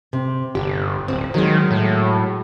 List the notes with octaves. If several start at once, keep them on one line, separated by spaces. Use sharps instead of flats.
C3
G1 G4
D1 C4
D#3 F#3 G#3
A2